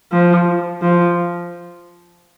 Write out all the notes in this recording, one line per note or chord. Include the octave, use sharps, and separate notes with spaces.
F3
F3